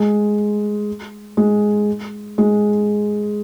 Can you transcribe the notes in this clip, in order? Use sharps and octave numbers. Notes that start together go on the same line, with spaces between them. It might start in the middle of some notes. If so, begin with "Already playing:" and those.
Already playing: G#3
G#3
G#3